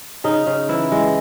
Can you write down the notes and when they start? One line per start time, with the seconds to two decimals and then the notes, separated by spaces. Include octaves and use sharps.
0.24 C#3 D#4
0.46 C#3
0.69 E3 E4
0.92 E3 G#3